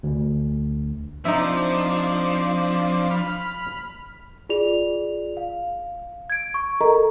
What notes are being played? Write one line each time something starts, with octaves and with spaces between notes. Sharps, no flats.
D2
F3 C4 D4 D#4 E5
B5 F6
F4 G#4 D5 F7
F5
G#6 D7
C#6
A4 A#4 D#5 A#5